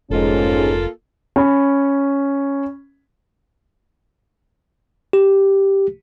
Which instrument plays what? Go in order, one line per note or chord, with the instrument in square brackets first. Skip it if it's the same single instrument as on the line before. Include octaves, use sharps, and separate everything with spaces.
[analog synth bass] F1 [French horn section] G#2 G#3 C#4 [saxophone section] A#3 F4 A4
[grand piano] C#4 B5
[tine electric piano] G4